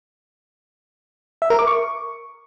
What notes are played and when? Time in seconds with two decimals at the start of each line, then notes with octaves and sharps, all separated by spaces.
1.42 E5
1.50 A#4
1.59 D6
1.67 C#6